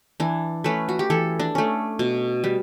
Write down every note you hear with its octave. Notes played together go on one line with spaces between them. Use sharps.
E3 D4
A3 C#4 B4
F#4
G4
E3 A4
D4
A3 C#4
B2
G3